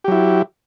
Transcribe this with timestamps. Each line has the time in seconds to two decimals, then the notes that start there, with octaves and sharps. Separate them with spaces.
0.04 G4
0.08 F#3
0.12 E4